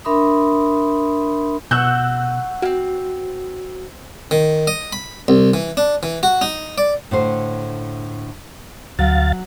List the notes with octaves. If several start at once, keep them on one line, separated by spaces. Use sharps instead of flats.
D4 A#4 E5 B5 C6 D#6
B2 F#4 E6 F#6 G6
A#3 C4 F#4
D#3
D#5
B5
C2
E3
D4
E3
F#4
D#4
D5
A2 D3 C5
D2 F#3 F5 A6